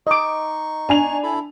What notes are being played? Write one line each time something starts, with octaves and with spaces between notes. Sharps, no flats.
D#4 D#5 C#6 D6
D4 G#5 F7
E4 A4 B5